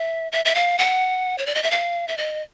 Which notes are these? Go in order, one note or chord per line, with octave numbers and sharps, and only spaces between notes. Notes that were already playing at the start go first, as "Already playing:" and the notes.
Already playing: E5
E5
E5
F5
F#5
C#5
D5
D#5
E5
F5
E5
D#5